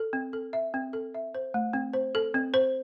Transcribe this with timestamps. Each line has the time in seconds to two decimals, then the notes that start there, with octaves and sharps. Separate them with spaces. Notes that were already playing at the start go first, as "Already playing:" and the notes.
Already playing: A4
0.13 C4
0.33 A4
0.53 E5
0.74 C4
0.93 A4
1.14 E5
1.35 C5
1.54 A3
1.73 C4
1.93 C5
2.15 A4
2.34 C4
2.54 C5